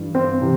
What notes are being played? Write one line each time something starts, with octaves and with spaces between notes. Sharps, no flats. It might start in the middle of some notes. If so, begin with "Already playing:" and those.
Already playing: G2 E3
C4
C3 E3